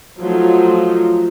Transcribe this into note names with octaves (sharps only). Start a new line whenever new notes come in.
F3 F#3 A3 D#4 F4